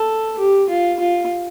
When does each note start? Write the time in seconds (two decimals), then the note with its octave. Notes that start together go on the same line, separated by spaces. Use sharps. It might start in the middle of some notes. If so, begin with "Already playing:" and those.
Already playing: A4
0.39 G4
0.69 F4
1.00 F4